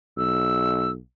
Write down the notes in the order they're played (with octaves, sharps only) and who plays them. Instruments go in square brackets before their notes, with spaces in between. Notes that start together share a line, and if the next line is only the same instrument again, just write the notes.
[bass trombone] B1 [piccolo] E6